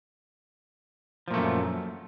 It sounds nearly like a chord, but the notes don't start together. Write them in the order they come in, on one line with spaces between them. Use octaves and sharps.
F3 A#2 A3 F#2